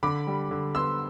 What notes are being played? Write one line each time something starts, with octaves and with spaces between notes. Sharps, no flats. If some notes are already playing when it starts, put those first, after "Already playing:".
D3 B5 D6
G3
D3
B3 C6 E6